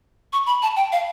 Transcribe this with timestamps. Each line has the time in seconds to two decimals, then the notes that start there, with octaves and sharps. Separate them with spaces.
0.33 C#6
0.46 B5
0.62 A5
0.76 G5
0.92 F5